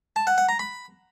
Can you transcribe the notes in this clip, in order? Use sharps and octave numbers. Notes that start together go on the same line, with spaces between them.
A5
F#5
F#5
A#5
B5